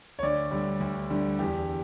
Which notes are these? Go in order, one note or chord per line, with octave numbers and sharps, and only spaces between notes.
C#5
D2 D5
D3 G3
D2
D3 G3
E2 G4